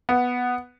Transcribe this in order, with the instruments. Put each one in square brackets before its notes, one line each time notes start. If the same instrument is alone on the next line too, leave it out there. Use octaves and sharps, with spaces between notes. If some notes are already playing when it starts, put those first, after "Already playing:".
[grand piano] B3